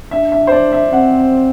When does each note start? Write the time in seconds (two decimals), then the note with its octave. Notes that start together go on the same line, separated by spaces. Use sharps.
0.11 D4 E5
0.32 E5
0.47 C5
0.52 D5
0.73 E5
0.93 C4 F#5